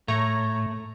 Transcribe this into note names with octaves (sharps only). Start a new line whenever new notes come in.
A2 A3 C#5 A#5